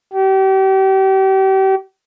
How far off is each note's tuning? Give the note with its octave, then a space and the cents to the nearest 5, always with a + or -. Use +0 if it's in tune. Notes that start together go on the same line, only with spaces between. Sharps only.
G4 -35